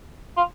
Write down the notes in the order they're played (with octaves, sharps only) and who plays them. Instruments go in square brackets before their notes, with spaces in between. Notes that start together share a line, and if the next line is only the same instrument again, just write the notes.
[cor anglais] F4